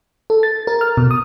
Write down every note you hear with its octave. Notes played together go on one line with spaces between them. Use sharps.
A4
A6
A#4
F6
B2
D#6